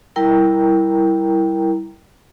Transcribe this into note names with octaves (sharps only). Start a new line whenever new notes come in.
G3 E4 A#4 G5 A#5